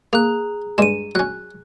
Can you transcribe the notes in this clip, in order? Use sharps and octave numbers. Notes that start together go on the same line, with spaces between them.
A#3 G#4 A#5 F#6
G2 G#3 D#7 E7
F#3 C#4 F#6